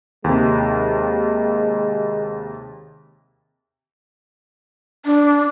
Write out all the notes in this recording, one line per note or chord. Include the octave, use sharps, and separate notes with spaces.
D#2 C3 G#3
D4